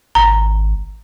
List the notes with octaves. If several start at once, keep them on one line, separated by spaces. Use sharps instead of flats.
G#1 A#5